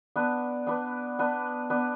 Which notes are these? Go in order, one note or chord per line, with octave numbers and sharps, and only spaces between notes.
B3 D4 B4 D5
B3 D4 B4 D5
B3 D4 B4 D5
B3 D4 B4 D5